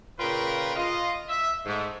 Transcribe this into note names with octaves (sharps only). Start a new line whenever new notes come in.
A#2 C#3 F4 A#4 B4 G5
F4 D#5
E5
G#2 A3